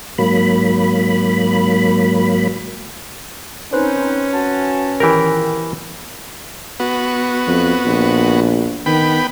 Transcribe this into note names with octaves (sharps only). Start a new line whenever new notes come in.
G#2 F#3 A#3 B5
C4 C#4 D#4 B4 C5
F#4 A5
E2 A#2 D#3 E3 G4 A#4
B3 F#4
F2
A#1
D#3 B3 G5 B5